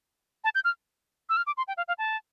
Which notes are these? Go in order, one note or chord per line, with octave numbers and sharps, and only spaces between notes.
A5
G6
F6
E6
F6
D6
C6
G5
F5
F5
A5